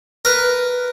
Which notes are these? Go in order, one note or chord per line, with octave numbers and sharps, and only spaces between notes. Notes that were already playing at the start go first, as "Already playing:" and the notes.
A#4 B4